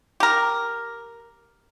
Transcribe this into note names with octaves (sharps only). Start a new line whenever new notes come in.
G4 A#4